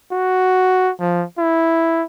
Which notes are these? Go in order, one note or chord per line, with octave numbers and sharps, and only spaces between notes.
F#4
F3
E4